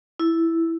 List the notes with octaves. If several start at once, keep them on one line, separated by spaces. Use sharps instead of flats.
E4